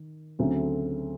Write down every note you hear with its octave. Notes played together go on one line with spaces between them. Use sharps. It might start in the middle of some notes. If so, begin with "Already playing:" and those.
Already playing: D#3
D2 C#3 F#3 A3 C4